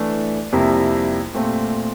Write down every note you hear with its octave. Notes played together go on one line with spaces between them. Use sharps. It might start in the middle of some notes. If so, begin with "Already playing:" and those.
Already playing: E3 A3 D4
F2 C3 G3 A#3 E4
A#2 A3 C4